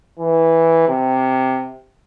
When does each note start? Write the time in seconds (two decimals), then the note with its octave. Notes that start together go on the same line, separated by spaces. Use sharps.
0.19 E3
0.88 C3